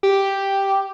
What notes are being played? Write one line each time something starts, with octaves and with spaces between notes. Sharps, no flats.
G4